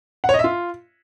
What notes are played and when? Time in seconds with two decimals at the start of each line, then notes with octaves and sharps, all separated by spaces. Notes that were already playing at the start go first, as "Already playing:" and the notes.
0.24 F#5
0.29 C#5
0.34 D#5
0.39 E5
0.44 F4